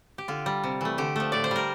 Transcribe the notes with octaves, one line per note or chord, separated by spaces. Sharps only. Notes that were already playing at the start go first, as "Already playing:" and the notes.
G4
D3 F4
G3
C3
E3 A3
D3 G4
F3 A3
A2 D5
C5
G3 A#4